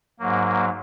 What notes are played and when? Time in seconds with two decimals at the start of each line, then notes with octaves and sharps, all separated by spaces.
0.19 G#2 F#3 A#3